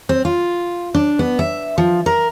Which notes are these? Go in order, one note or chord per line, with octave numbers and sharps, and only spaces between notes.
C4
F4
D4
B3
E5
F3
A#4